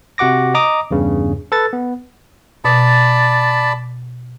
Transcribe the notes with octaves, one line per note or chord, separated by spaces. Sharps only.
C3 F#4 F#5 D6 A#6
D#5 A#5 D6 D#6
E2 G2 C#3
A4 B4 A6
B3
B2 D5 A5 B5